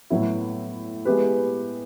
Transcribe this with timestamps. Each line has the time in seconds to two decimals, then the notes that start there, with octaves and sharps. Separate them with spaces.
0.10 A2 F#3 B3 E4
1.05 G#3 B3 E4 G4 B4